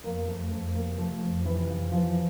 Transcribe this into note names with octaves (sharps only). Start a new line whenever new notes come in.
F2 A#3 A#4
F2 A3 A4
F2 A3 A4
C3 A#3 A#4
F3 A3 A4
F2
C3 E3 E4
F2
E3 F3 F4